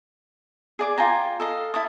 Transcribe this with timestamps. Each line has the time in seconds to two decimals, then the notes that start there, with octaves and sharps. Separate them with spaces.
0.79 G#4 D5 D6
0.98 F4 G5 G#5 A#5
1.40 A4 D#5 F5
1.74 E4 A5 D#6